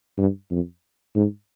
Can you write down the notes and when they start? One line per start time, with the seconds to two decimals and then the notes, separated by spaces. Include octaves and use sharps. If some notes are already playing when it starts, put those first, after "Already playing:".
0.18 G2
0.51 F2
1.15 G#2